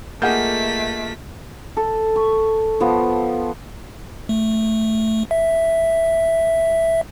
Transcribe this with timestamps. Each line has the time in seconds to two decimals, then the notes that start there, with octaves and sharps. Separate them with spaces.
0.22 A3 A#3 F4 G#4 D#5 F#5 G6 B6
1.77 A4
2.16 C#6
2.80 F3 B3
4.29 A3
5.31 E5